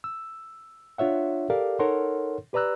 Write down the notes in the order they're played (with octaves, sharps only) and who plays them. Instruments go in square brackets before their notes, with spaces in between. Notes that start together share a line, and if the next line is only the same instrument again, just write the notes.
[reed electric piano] E6
D4 F4 C#5 E5 F#5
G4 A4 A#4 D5 F5
D#4 A4 A#4 C#5 F#5 C6
G4 B4 D5 A#5 E6 F#6